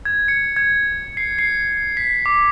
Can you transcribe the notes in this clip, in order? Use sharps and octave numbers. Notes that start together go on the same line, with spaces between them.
G#6
C#7
G#6
C7
C7
B6
D6